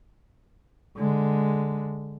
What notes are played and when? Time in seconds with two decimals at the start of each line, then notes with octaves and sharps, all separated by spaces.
0.97 D3 G#3